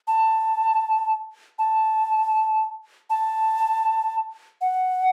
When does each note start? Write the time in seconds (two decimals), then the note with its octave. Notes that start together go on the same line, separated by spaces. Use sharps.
0.08 A5
1.59 A5
3.10 A5
4.61 F#5